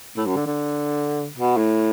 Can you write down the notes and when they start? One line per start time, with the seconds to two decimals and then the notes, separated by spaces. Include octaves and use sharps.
0.17 A2
0.26 F#2
0.36 D3
0.46 D3
1.37 B2
1.57 A2